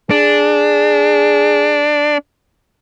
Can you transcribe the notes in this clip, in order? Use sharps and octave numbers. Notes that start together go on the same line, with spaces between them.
D4 G#4